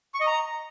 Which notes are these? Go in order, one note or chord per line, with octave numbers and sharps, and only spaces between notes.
C#6
D#5
A#5